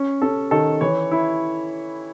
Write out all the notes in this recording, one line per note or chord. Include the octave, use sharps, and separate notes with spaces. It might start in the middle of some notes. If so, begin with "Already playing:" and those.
Already playing: C#4
C#4 A4
D#3 A4
E3 C#5
E4